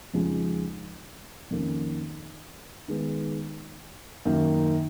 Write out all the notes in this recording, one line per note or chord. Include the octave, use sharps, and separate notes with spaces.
F2 C#3 F3 G#3 D#4
F2 D#3 A#3 C#4
D#3 G#3 B3
F#2 D#3 A#3